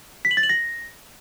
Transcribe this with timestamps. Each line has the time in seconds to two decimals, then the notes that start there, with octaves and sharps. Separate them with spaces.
0.25 B6
0.31 F#7
0.37 A6
0.43 F#7
0.49 A#6